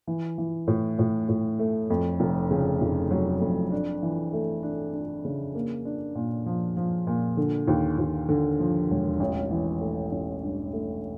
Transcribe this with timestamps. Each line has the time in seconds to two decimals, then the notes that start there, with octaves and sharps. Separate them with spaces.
0.07 E3
0.38 E3
0.68 A2
0.99 A2
1.29 A2
1.59 A3
1.90 F2
2.20 F1
2.51 C#3
2.81 F1
3.11 F#3
3.41 F2
3.72 D4
4.03 E3
4.33 A3
4.63 D4
4.93 D4
5.25 C#3
5.55 A#3
5.85 D4
6.15 A#2
6.46 F3
6.77 F3
7.07 A#2
7.37 D3
7.68 D#2
7.98 D#2
8.29 D3
8.60 F3
8.90 E1
9.20 A1
9.51 E3
9.81 A3
10.12 A1
10.43 G2
10.73 A3